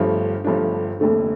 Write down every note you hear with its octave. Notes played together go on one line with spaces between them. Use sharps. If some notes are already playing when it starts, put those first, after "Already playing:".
Already playing: G1 G2 F3 A3
G1 G2 F3 A3 D4
F1 D#2 D3 A3